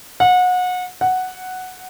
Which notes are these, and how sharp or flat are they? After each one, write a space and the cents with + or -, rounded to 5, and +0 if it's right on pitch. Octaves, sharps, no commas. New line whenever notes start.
F#5 -30
F#5 +0